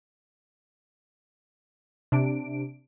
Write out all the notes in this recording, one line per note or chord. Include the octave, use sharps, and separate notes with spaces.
C3 D4 D7